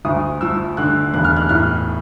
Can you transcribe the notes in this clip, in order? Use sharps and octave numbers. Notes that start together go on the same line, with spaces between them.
D2 D#6
F3 E6
D3 F#6
E1 F#6
F6
F#6
A2 F6